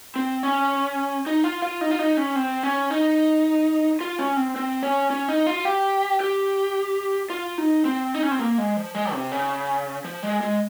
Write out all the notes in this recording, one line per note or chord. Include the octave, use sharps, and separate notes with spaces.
C4
C#4
D#4
F4
F4
D#4
F4
D#4
C#4
C4
C#4
D#4
F4
C#4
C4
C4
C#4
C#4
D#4
F4
G4
G4
F4
D#4
C4
D#4
C#4
C4
A#3
G#3
F3
G#3
C3
C#3
F3
G#3
G#3